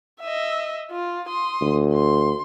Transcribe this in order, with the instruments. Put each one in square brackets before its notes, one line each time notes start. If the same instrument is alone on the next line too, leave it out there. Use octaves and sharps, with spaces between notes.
[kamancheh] D#5 E5
F4
C6 D#6
[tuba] D2
[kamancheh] C6